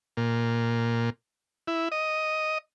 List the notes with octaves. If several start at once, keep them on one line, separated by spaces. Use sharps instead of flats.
A#2
E4
D#5